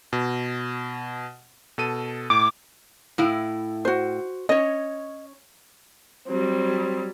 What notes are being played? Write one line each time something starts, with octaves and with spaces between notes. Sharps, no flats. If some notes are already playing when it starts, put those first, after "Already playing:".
B2
B2 A4 D#7
A2 D6
A2 E4 F5
F#4 C5
C#4 C#5 D#5
F#3 G3 C4